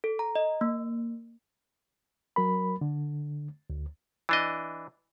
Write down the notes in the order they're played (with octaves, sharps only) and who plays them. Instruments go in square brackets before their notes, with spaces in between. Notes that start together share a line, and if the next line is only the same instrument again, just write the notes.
[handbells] A4
A#5
D#5
A#3
[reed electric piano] F#3 A#4 B5
D3
D2
[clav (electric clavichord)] E3 D4 D#5